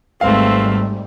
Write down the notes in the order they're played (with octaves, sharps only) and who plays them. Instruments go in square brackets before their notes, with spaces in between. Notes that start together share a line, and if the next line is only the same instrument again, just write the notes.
[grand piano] G#1 B4 F5 [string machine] G#2 G3 [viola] A3 C4